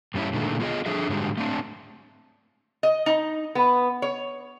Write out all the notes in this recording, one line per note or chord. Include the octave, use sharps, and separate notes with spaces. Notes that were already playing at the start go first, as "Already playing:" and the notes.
G2 G3 C#4 E4
A#2 D3 D#3 G#3 A3
B3 F4 G#4 D#5
F3 D4 G#4 A4 E5
G#2 D3 G3 G#3 F#4 G4
A3 C4 D4
D#5
D#4
B3
C#5